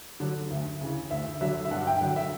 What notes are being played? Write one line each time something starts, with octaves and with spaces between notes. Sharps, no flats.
D3 F#3
D2
C#3 E3
D2 E5
D3 F#3 E5
E5
G2 F#5
G5
D3 F#3 F#5
E5